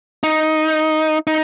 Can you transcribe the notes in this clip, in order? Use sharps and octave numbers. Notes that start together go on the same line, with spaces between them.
D#4
D#4